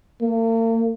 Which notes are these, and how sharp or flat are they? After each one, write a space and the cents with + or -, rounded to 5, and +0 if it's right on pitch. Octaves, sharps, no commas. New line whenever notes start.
A#3 -45